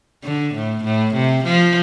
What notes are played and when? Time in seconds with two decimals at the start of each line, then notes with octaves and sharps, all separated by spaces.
0.24 D3
0.54 A2
0.84 A2
1.14 C3
1.44 F3